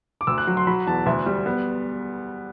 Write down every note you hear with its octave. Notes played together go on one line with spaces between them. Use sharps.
D6
D2 E6
F#6
F#3
C6
F#3 B5
E2 A5
D2 E5
G3
B3